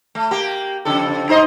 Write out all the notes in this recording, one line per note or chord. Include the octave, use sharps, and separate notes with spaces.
A3
A#3 G4
F2 C#3 A4
D#4 C5 D#5